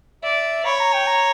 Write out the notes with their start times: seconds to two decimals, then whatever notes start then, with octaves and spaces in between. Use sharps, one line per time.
0.23 D5 E5
0.65 C#5 B5
0.80 A#5
0.93 G5
1.07 A#5